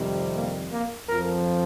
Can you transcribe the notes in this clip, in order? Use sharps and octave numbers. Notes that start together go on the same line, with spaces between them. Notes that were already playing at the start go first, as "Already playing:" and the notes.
Already playing: F2 C3 D#3 G3
A#3
A#3
F2 F3 A#4